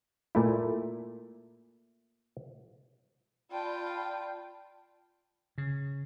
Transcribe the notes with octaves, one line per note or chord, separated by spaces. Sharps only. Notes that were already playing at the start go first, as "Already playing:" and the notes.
A#2 A3 E4
F4 D5 G5 A5 B5
C#3